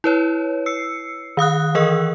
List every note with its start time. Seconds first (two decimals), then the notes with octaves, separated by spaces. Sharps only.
0.04 E4 B4 C#5
0.66 E6 C7 C#7
1.37 D#3 F5 D#6 F#6
1.75 E3 G#4 A#4 D#5 E6